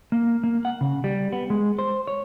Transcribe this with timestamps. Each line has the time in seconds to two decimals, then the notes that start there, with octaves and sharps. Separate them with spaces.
0.12 A#3
0.44 A#3
0.65 F#5
0.81 C#3
1.04 G3
1.32 B3
1.50 G#3
1.79 C5
2.07 C#5